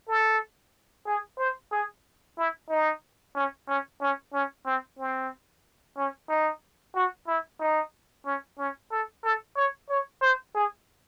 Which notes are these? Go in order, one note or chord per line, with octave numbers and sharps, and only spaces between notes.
A4
G#4
C5
G#4
E4
D#4
C#4
C#4
C#4
C#4
C4
C4
C#4
D#4
F#4
E4
D#4
C#4
C#4
A4
A4
C#5
C#5
C5
G#4